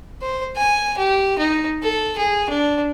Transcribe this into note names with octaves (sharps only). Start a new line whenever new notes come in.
C5
G#5
G4
D#4
A4
G#4
D4